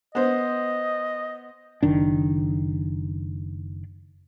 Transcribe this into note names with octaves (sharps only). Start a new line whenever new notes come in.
B3 C5 D#5
F#1 D#3 D4